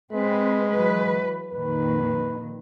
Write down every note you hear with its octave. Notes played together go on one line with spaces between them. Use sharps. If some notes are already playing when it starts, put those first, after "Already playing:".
G#3 C4 B4
E3 F#3 B4
F2 A#2 D#3 B4